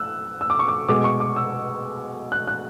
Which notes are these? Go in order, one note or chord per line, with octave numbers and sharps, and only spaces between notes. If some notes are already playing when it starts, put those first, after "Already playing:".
Already playing: E6 F#6
E6
D6
C#6
D6
B2 G#3 D6
C#6
D6
E6
F#6
F#6